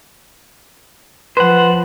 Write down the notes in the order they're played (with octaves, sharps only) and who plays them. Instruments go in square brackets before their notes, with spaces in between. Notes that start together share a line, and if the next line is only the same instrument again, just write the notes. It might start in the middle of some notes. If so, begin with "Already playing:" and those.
[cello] F3 [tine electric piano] B4 B5 [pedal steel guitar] C5 F#5